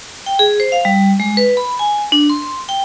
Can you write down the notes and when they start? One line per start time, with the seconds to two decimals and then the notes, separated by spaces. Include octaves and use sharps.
0.26 G5
0.39 G#4
0.60 C5
0.72 F5
0.85 G3
1.20 G#3
1.37 B4
1.57 B5
1.79 G#5
2.12 D4
2.30 C6
2.69 G5